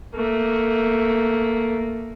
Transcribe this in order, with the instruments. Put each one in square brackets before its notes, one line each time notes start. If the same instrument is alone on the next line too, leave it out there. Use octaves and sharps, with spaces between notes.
[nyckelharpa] A3 A#3